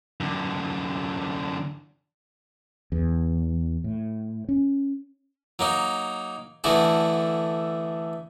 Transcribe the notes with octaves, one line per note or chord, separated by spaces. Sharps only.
F#2 D3
E2
A2
C#4
F#3 A#3 D#4
D3 E3 A3 F#4 G#4